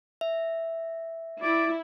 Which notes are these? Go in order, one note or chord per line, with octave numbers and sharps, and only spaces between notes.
E5
E4 D5